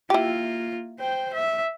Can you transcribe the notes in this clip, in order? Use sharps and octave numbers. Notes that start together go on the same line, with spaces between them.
A#3 E4 F4 G4
C5 G5
E5